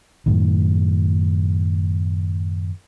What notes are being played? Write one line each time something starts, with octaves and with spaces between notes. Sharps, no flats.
F#2 A2 D#3